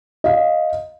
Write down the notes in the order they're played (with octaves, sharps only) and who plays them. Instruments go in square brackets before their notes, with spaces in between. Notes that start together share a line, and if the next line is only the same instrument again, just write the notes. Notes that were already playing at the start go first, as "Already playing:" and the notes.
[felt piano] D#5 F5